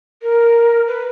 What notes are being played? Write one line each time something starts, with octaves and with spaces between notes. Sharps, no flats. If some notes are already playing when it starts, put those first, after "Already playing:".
A#4
B4